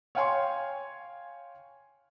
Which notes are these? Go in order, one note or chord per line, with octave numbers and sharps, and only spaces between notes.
C#5 F5 G5 G#5 C6 C#6